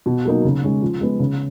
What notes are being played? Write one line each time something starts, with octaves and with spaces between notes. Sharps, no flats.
B2
F#3 A#3 D#4
C#3
G#3 C#4
F3
G#3 B3
C#3